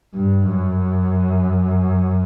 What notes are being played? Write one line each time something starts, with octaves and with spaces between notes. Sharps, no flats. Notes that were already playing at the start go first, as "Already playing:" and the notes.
G2
F#2